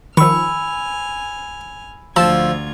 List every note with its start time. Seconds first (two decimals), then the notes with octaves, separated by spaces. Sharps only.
0.17 D#3 F3 G#5 B5 C#6 E6 F6
2.16 D2 F3 F4 A5 E6 G#6